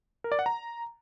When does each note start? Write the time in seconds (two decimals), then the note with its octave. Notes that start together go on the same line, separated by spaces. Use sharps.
0.24 A#4
0.32 D5
0.39 F#5
0.46 A#5